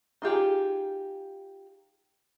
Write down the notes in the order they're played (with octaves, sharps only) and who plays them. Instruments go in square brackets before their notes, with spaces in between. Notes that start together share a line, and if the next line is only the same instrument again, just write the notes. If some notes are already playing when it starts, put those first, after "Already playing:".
[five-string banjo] D#4 F4 G4 G#4